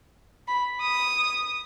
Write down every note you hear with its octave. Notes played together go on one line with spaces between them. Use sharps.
B5
D#6